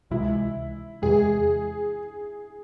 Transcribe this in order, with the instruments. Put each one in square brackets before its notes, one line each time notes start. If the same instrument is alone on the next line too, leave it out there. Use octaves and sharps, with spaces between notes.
[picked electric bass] C#2 C3 E3 G#3 [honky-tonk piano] E4
[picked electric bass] E2 C3 E3 G#3 [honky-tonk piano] G#4